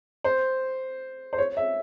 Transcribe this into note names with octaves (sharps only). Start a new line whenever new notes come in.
C5
C5
C#5
E5